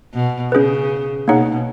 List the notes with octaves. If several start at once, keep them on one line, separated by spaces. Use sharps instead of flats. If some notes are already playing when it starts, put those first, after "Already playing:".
B2
C#3 C#4 G#4 B4
B2 A#3 D#4 G#4 C#5 F#5